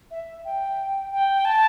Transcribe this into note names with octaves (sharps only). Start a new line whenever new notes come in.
E5
G5
G5
A5